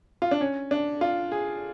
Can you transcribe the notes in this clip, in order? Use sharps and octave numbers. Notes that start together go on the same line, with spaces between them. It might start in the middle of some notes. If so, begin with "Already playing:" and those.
F4
D4
C#4
D4
F4
G#4